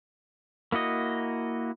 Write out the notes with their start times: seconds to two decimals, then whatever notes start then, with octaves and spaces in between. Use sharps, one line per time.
0.72 A#3 E4 F#4 D#5